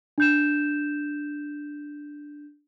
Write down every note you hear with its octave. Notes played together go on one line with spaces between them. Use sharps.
D4 G6 E7